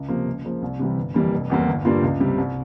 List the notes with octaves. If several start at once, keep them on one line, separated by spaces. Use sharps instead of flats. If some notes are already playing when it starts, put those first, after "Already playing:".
Already playing: C#2
C3 F3 A#3
C#2
C#3 F3 A#3
C2
C3 E3 G3
G1
F2 E3 G3 A#3
F1
E2 C3 G3 A#3
G1
G2 G3 A#3 F4
C#2
C3 G3
C2